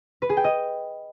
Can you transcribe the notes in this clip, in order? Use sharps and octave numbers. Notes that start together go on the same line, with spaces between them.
B4
G#4
G5
D#5